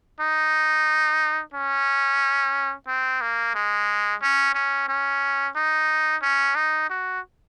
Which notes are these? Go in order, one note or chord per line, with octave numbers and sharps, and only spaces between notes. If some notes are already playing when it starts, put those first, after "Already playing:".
D#4
C#4
C4
A#3
G#3
C#4
C#4
C#4
D#4
C#4
D#4
F#4